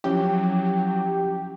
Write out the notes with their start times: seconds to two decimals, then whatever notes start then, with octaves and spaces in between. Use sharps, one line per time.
0.04 F3 F#3 C#4 E4 G4